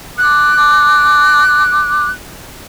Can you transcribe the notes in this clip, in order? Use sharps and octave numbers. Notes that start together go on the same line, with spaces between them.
D6 F#6